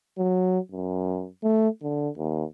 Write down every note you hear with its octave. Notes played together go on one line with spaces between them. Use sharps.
F#3
F#2
A3
D3
D#2